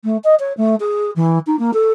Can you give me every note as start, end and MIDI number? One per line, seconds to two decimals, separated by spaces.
0.04 0.17 57
0.24 0.35 75
0.40 0.53 73
0.57 0.75 57
0.80 1.11 68
1.16 1.39 52
1.47 1.56 63
1.59 1.71 58
1.74 1.92 69